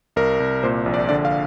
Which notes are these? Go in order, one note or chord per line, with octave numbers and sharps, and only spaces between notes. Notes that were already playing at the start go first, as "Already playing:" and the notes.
C2 A#4
C2
A#2 C5
A#1
D5
D3 D5
F5